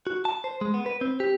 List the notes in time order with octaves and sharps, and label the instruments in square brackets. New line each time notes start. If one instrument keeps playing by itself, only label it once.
[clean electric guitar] F#4
A5
C5
G#3
B3
B4
C4
G4